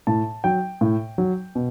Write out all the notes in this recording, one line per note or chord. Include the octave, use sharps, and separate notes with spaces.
A2 A5
F#3 G5
A2
F#3
B2